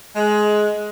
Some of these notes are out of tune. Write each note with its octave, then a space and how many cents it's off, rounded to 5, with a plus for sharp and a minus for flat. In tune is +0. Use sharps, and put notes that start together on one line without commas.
G#3 +15